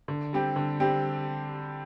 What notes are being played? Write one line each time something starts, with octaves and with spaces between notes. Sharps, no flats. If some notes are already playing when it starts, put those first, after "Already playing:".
D3
G3 C4 G4
D3
G3 C4 G4